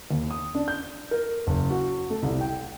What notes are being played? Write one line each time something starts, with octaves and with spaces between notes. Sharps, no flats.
D#2
D#6
D4
G6
A#4
F#1
F#4
A3
C2
G5